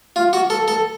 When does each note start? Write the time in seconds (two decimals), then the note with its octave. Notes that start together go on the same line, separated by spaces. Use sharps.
0.16 F4
0.33 F#4
0.50 A4
0.68 A4